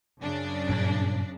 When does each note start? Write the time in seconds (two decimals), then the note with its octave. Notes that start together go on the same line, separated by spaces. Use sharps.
0.21 F#2 C#3 D4
0.69 G2 A#2